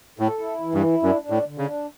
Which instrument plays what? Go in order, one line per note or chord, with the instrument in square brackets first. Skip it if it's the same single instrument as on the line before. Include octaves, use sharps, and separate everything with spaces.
[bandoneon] A2 [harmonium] A4
[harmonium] E4
E3
[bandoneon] G2
[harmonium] E4
[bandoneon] F#2 [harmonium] D4
[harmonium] D4
[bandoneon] A2
[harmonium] D3
[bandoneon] C#3
[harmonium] D4